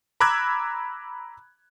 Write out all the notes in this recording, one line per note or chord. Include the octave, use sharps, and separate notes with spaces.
A#5 B5 D6 E6 F#6 G#6